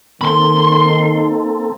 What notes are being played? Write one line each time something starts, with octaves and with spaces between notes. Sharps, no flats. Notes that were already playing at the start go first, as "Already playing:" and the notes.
D#3 A#3 C4 D#4 A4 B5 C6